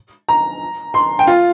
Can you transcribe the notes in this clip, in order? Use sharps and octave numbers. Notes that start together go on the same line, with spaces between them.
A#5
C6
G5
F4